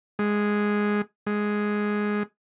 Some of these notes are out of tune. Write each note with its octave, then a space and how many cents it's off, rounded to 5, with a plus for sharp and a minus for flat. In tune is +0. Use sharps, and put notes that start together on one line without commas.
G#3 +0
G#3 +5